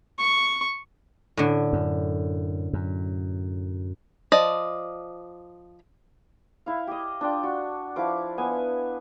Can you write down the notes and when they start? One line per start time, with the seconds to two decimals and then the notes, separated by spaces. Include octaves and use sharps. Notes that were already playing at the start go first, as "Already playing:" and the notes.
0.18 C#6
1.37 A2 D3
1.73 F#2
2.73 F#2
4.32 F3 D5 D#5
6.66 E4 F5
6.87 G4 D#5
7.21 D4 F4 G5
7.43 F#4
7.96 F3 E4 F5 D6
8.38 B3 G#5